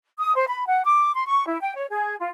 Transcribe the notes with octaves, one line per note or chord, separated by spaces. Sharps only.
D#6
C5
B5
F#5
D6
C6
C#6
E4
G5
C#5
G#4
F4